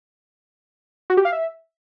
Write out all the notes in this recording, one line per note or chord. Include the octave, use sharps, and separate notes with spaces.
F#4
G4
F5
E5